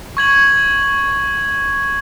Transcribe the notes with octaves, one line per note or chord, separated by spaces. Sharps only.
C#6 G#6 F#7